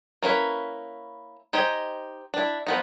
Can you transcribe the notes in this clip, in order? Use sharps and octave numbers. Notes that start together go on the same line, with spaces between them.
A#3 C#4 E4 B4
D#4 G4 C5 D#5 G#5
D4 E4
F3 B3 D#4